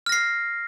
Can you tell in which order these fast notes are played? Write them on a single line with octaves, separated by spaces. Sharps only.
F6 A#6 C7